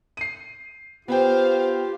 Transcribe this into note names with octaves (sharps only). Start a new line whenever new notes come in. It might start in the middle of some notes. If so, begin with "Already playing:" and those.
C7 D#7
B3 F4 G4 C5 F5 G5